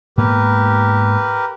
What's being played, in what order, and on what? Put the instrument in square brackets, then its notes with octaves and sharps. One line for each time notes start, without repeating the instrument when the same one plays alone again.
[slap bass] G#2 A#3 B3 [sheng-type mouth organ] G4 A#4 B4